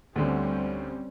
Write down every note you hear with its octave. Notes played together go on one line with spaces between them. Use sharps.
D2 D3 G3 C4 C#4